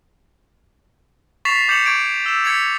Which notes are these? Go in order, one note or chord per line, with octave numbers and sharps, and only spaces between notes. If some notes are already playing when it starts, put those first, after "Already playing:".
C#6 A6 B6 C7 E7 F7
D6 G6 B6 C#7 E7 F#7
C#6 G#6 D7
E6 E7
G#6 B6 C#7 F7